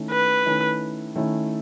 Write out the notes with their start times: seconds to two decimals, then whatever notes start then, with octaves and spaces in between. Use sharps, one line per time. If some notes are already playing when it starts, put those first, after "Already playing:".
Already playing: D#3 A3 C#4 E4
0.11 B4
0.46 D#3 A3 C#4 E4
1.15 D#3 A3 C#4 E4